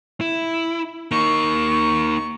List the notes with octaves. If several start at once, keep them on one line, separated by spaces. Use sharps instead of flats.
E4
A#3 D#4 C#6